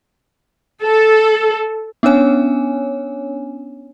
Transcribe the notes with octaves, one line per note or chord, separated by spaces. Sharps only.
A4
B3 C#4 D4 C#5 G#5